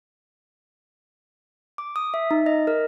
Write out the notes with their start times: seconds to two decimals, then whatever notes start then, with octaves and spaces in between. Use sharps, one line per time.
1.78 D6
1.96 D#6
2.14 E5
2.31 D#4
2.46 D#5
2.67 A#4